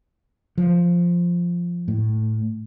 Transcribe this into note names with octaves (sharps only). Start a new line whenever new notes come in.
F3
A2